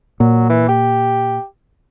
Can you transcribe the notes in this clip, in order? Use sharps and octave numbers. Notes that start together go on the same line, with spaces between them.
A#2 F#3
E3
G4